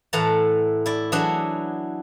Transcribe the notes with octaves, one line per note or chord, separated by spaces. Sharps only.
A2 E3 F#5 A5 A#5
E4 D5
E3 F#3 D4 G#4 E5 F#5